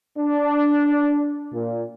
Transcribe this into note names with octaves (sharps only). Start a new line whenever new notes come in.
D4
A#2